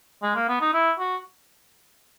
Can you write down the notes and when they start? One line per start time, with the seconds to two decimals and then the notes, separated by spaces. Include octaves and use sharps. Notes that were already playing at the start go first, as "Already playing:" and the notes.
0.22 G#3
0.36 A#3
0.49 B3
0.61 D#4
0.74 E4
0.99 F#4